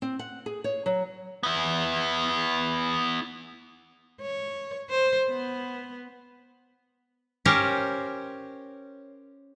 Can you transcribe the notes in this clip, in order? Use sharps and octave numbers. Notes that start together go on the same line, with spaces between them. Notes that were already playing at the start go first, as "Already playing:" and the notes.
C4
F#5
G#4
C#5
F#3
B3 E4
C#5
C5
B3
C#4 G4 A#4 C5 C#5